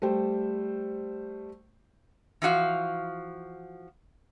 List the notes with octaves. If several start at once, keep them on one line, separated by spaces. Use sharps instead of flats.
G3 A3 C5 G5
E3 F3 F#4 F5